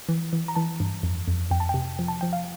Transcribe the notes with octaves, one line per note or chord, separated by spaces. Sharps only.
E3
E3
A#5
E3 A5
G2
F2
F2
F2 G5
A5
C3 G5
F3
A5
F3 G5
F5